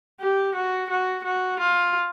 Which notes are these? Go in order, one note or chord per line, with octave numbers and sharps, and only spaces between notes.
G4
F#4
F#4
F#4
F4